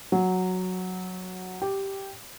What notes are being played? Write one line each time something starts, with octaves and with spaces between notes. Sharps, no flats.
F#3
G4